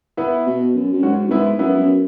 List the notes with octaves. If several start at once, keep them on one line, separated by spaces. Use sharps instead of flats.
B3 E4
B2
F#2
F#2
G#2 C#4 F#4
F#2
G#2 B3 E4
F#2 B3 E4
F#2